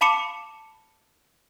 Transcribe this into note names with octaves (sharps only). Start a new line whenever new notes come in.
F5 A5 B5 D6 C#7 E7